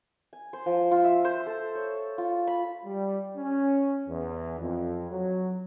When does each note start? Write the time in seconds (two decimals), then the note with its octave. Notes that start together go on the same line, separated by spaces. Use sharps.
0.33 G#5
0.53 C5
0.66 F3
0.91 F4
1.04 E5
1.25 C5
1.47 A4
1.75 C#5
2.18 F4
2.47 B5
2.85 G3
3.36 C#4
4.08 E2
4.60 F2
5.10 F#3